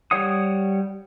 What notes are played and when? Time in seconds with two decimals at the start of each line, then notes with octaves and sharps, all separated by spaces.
0.11 G3 C#5 F#5 D#6